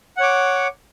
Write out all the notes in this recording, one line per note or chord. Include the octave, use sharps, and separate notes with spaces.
C#5 F#5 D6